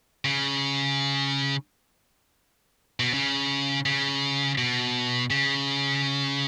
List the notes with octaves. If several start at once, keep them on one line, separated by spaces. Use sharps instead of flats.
C#3
B2
C#3
C#3
B2
C#3